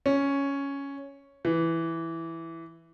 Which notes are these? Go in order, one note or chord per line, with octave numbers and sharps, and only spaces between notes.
C#4
E3